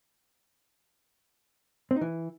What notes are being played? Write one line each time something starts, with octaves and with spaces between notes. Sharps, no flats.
C4
D#4
E3